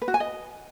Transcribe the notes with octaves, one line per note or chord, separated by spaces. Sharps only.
B4
F#4
G#5
D#5